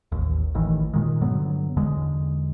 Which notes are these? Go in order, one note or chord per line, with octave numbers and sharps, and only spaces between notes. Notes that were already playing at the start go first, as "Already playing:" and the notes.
A1 D#2
A1 A2 D#3 E3
A#2 D#3 G#3
G2 D3 F#3 B3
E2 D3 G#3